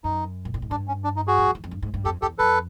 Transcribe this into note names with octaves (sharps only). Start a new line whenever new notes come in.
F#2 D#4
A#2
A2
G#2
G2 D4
C#4
D4
D#4
F#4 G#4
F#2
F2
E2
F2
G2
G#2
G2
F2 G4 A4
E2 G4 A4
F2 A4 B4